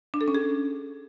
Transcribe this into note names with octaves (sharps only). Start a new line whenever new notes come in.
D4
A4
C#4
G#4